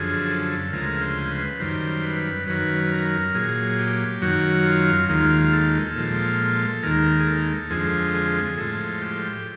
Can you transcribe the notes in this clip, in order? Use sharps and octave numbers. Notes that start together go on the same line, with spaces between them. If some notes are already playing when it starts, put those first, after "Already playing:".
Already playing: F#2 D3 F3 G#4
A4
D2 C#3 F3 G#3 A#4
C5
B4
F#2 D#3 G3 C5
B4
F#2 D#3 F#3 B4
B4
A#4
A#2 F#3 G#4
G4
F#2 D#3 F#3 F#4
F4
D#2 D#3 G#3 F4
A4
A#2 F3 G#3
D#2 D#3 G#3 A#4
G#4
A4
F2 D3 F3 G#3 G#4
G#4
A2 F3 G#3 A4
G4